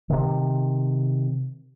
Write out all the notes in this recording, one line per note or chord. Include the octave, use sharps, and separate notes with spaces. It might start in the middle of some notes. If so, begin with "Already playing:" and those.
C3 D#3